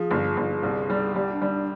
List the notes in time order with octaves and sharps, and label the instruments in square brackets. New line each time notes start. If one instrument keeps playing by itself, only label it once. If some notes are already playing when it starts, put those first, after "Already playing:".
Already playing: [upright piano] F3 [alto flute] G#4
[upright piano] G1
G1
C2
G3
[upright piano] G3 [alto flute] G4
[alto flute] D4
[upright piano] G3
[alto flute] D4